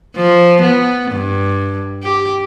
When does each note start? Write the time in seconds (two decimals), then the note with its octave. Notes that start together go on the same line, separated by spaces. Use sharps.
0.16 F3
0.62 B3
1.12 G2
2.03 G4